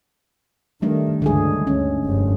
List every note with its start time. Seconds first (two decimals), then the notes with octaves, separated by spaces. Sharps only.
0.82 D#3 G3 A3 D4
1.22 C#2 G2 D3 E3 G#3 G#4
1.67 D2 C#4
2.03 F1 G2